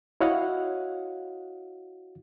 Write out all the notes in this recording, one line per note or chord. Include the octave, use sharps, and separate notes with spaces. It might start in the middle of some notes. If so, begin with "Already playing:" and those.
E4 F#4 C#5 D#5 F5 F#5